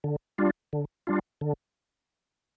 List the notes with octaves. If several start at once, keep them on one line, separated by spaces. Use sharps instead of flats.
D3
G3 D4 F4
D3
G3 D4 F4
D3